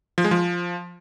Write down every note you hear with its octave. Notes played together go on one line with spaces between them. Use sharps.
F3
G#3
F3